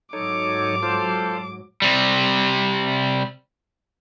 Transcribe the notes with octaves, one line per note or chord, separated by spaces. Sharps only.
G#2 F#3 D#4 A4 C#5 D6
F4 A4 C5
C3 G3